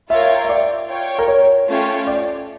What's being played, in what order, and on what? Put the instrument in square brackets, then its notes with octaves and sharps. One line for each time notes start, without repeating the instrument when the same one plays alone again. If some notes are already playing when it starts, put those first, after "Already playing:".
[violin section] F4 A#4 C#5 G5 [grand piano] E5
[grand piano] E5
D5
[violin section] F4 C#5 G5
[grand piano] A#4
C#5
[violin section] A3 C#4 F4 C#5 G5
[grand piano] D5